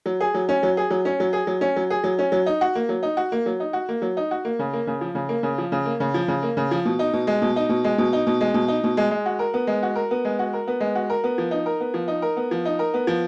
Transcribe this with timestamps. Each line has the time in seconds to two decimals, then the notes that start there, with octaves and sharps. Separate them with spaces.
0.06 F#3
0.20 G#4
0.34 F#3
0.49 C#4
0.63 F#3
0.77 G#4
0.90 F#3
1.05 C#4
1.20 F#3
1.33 G#4
1.47 F#3
1.61 C#4
1.76 F#3
1.90 G#4
2.04 F#3
2.19 C#4
2.32 F#3
2.46 D#4
2.61 F#4
2.75 A#3
2.89 F#3
3.03 D#4
3.17 F#4
3.32 A#3
3.46 F#3
3.60 D#4
3.73 F#4
3.89 A#3
4.02 F#3
4.17 D#4
4.31 F#4
4.45 A#3
4.59 C#3
4.73 A#3
4.87 C#3
5.01 F3
5.15 C#3
5.29 A#3
5.43 C#3
5.58 F3
5.72 C#3
5.85 A#3
6.00 C#3
6.14 F3
6.28 C#3
6.43 A#3
6.57 C#3
6.71 F3
6.85 B2
6.99 D#4
7.13 B2
7.27 G#3
7.42 B2
7.56 D#4
7.69 B2
7.84 G#3
7.98 B2
8.13 D#4
8.27 B2
8.41 G#3
8.54 B2
8.68 D#4
8.84 B2
8.97 G#3
9.11 G#3
9.26 F#4
9.39 A#4
9.54 B3
9.67 G#3
9.83 F#4
9.96 A#4
10.11 B3
10.25 G#3
10.39 F#4
10.53 A#4
10.67 B3
10.80 G#3
10.95 F#4
11.10 A#4
11.24 B3
11.38 F3
11.51 D#4
11.66 A#4
11.80 B3
11.94 F3
12.08 D#4
12.22 A#4
12.37 B3
12.51 F3
12.65 D#4
12.79 A#4
12.94 B3
13.07 F3